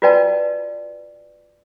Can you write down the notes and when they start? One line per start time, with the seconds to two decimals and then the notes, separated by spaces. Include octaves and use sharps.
0.02 F4 F#4 B4 D5 G5 A5